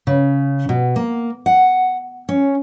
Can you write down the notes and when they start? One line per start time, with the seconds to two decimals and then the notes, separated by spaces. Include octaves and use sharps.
0.07 C#3
0.69 B2
0.96 A#3
1.46 F#5
2.29 C#4